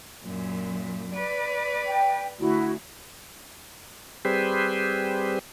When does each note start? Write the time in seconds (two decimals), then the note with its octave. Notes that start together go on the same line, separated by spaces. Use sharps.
0.24 F#2 A#2
1.14 B4 D5
1.86 G5
2.40 D2 E4 F#4
4.25 G3 C4 G4 G#4 B4 C5